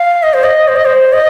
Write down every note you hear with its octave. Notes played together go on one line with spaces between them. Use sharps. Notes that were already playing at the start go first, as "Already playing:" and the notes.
Already playing: F5
D#5
C5
D#5
C5
D#5
C5
D#5